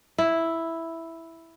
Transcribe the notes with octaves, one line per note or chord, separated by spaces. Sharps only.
E4